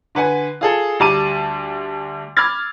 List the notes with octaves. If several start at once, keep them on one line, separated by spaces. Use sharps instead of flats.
D3 B4 F#5 G#5
F4 G#4 A4
D2 G3 A5 D6 D#7
B5 D6 E6 F6 G#6 A6